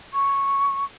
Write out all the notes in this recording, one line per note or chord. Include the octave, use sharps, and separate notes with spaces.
C#6